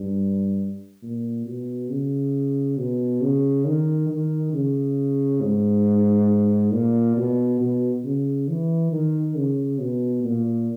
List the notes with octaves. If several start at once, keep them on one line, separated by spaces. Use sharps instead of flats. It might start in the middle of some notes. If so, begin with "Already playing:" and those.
Already playing: G2
A#2
B2
C#3
B2
C#3
D#3
D#3
C#3
G#2
A#2
B2
B2
C#3
E3
D#3
C#3
B2
A#2